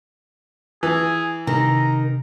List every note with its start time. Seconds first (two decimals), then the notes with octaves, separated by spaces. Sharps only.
0.83 E3 G#4
1.47 C3 D#3 A#5